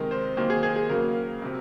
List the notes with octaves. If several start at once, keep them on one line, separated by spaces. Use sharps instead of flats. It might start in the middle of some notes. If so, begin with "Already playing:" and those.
Already playing: C3 D#3 G#3 A#4
C5
D#3 F#3 A#3 C5
G#4
G#4
G#4
C#3 F#3 A#3 A#4
C3 F#3 C4